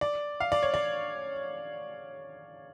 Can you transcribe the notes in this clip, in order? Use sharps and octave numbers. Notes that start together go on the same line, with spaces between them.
D5
F5
D5
C#5
D5